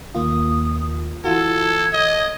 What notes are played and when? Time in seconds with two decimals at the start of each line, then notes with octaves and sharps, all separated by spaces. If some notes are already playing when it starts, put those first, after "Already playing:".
0.15 D#2 A#3 F4 D#6
1.24 E3 F4 F#4 A4 G#6
1.93 D#5